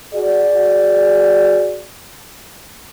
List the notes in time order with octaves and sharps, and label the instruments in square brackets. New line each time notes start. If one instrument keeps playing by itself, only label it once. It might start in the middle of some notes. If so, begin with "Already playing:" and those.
[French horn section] F#4 G#4 D5